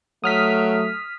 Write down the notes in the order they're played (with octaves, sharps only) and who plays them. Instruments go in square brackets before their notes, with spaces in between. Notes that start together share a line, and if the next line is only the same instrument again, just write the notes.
[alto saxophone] F#3 [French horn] A3 [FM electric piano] D#6 F6 B6